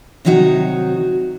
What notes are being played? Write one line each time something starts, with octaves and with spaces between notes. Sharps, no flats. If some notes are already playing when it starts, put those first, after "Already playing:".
C3 D#3 F#3 D#4 F#4